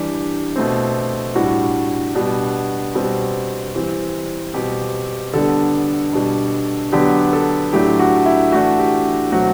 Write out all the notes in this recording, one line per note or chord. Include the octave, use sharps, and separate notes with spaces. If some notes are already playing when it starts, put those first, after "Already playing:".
Already playing: E3 G3 D4 G4
B2 A3 C4
A2 G3 D4 F#4
B2 G3 B3 D4
B2 G3 C4
E3 G3 C4
B2 G3 C4 G4
D3 G3 B3 D4 A4
B2 G3 D4
D3 F#3 B3 D4 G4
A4
A2 F#3 A3 D4 G4
F#4
E4
E3 A3 D4 F#4
G4
B2 F#3 A3 C4 F#4